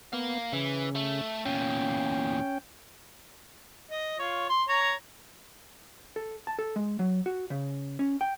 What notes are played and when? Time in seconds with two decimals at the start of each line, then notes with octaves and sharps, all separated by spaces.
0.13 B3 A#4 F5
0.53 C#3 E3
0.95 A3
1.45 E2 A#2 C#4 G5
3.91 D#5
4.19 F4 C#5
4.49 C6
4.69 C#5 A#5
6.16 A4
6.47 A5
6.59 A4
6.76 G#3
6.99 F#3
7.26 F#4
7.50 C#3
7.99 C#4
8.21 G5